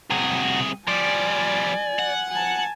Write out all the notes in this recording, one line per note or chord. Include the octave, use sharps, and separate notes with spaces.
C2 C3 F#4 G#4
F3 G3 D5 G#5
F#5
G#5 A5